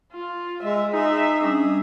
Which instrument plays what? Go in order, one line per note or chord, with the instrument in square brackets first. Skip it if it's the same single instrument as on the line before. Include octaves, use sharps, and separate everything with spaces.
[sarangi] F4
[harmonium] G#3 [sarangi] E5
[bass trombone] D#4 [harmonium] G#4 [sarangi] E5
[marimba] G3 C#4 D4